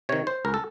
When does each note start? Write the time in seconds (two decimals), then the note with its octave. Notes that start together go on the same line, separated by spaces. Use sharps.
0.09 C3 D#3 C#5
0.27 C5
0.45 C#2 A#4
0.54 A4